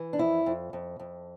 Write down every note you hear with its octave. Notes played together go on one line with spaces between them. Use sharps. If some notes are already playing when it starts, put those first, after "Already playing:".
Already playing: E3
D4
F2 E4
F2
F2
F2